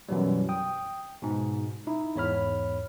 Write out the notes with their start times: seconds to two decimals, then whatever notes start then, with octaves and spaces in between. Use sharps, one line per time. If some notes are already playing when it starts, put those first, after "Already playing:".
0.09 F#2 B2 E3 F#3 G3
0.49 G5 D#6
1.22 G#2 B2
1.87 D#4 E4
2.16 E2 G#2 C#5 B5 F6